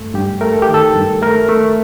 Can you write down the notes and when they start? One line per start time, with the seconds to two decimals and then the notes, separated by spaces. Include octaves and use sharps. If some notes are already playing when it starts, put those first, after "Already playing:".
Already playing: G2 A3
0.14 G2 G4
0.41 A3 A#4
0.53 A4
0.62 G4
0.69 D#3
0.74 A4
0.96 G2
1.22 A3 A#4
1.49 A3